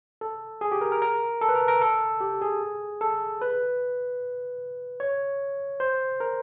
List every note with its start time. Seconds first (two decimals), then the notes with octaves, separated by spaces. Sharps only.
0.21 A4
0.61 G#4
0.72 G4
0.81 A#4
0.92 A#4
1.02 A#4
1.41 A4
1.49 B4
1.55 A#4
1.68 A#4
1.81 A4
2.21 G4
2.42 G#4
3.01 A4
3.42 B4
5.00 C#5
5.80 C5
6.20 A#4